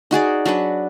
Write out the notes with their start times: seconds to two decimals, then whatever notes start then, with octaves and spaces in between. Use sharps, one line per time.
0.11 D#4 F#4 G#4 D5
0.45 F#3 D4 F#4 B4